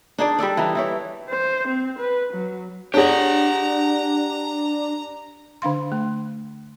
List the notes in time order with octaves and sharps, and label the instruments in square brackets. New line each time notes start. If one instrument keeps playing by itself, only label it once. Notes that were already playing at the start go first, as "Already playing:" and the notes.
[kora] D4 D#4 G#4 D5
G3 D4 A4 D5
E3 D#4
E3 E4 C#5
[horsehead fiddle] C5
C4
B4
F#3
[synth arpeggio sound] D4 [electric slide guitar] G4 F#5 [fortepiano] G#4 C#5 [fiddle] A#5
[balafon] D3 D4 F5 C6
A3